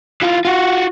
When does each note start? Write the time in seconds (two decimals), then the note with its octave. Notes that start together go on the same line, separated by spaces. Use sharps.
0.22 E3 F4
0.45 F4 F#4